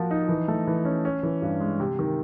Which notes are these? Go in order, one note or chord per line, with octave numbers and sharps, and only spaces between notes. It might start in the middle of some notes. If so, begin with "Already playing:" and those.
Already playing: F3 A#3 F#4
D#4
E3
A3
E3
C#4
C#4
E3
G2
G#3
C3
D#3